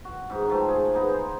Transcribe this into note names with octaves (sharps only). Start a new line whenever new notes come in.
F#4
G#2 D#4
D#3 F3 A3
G#4
B3 D#4 G#4
C5